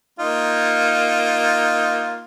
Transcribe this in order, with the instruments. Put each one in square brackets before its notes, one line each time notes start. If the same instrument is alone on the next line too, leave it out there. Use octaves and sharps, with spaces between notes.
[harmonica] A#3 D#4 F4